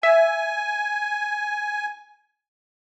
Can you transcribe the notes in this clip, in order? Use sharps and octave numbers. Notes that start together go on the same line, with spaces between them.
E5 G#5